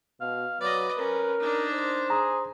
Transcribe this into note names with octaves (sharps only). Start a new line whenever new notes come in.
B2 F5
F#3 B4 D5 D#5
C#4 A#4
D4 D#4
C5
G#4 A#5